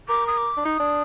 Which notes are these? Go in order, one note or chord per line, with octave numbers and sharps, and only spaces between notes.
A#4 D6
D#6
D6
D4
D#4 D#6
D4